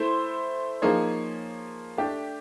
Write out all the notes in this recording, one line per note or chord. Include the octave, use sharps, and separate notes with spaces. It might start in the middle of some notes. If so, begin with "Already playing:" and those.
Already playing: A3 E4 C5
F3 A#3 D#4 G#4 C#5
A3 D4 G4